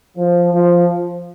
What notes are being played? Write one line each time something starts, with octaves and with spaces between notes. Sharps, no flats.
F3
F3